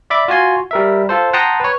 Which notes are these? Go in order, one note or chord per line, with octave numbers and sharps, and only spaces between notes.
D5 E5 B5 D6
F4 F#4 G#5 C6
G3 A#4 E5
F4 A4 C5
F#5 G5 A5 A#5 C6 D#6
B4 C#5